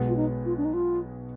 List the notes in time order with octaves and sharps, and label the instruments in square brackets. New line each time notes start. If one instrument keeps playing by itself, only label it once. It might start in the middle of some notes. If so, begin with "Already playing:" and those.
Already playing: [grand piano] B1 B2 G#3 B3
[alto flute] F4
D#4
F4
D4
D#4
F4